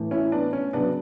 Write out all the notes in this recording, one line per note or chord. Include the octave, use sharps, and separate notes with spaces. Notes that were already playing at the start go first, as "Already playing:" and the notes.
Already playing: A2 E3
C#4 E4
B3 D4
C#4
C#3 F#3 B3 D4